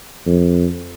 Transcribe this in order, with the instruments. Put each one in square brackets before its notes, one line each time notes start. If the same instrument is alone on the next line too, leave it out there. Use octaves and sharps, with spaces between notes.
[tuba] F2